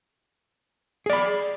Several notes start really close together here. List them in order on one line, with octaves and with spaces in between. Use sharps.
G#4 D5 B5